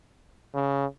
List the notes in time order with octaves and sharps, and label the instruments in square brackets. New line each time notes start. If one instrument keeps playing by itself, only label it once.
[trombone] C#3